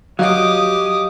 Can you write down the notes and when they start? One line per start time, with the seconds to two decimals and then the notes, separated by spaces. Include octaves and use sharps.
0.19 F#3 G4 C#5 D#5 F5 D6 D#6